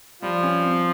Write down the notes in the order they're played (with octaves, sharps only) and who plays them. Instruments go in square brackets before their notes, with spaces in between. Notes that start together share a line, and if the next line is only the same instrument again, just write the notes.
[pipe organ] F3 [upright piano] G3
[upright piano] C#4
C4